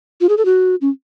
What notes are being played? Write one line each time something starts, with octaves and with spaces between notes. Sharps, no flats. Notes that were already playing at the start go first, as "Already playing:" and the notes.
F4
G#4
A4
F#4
C#4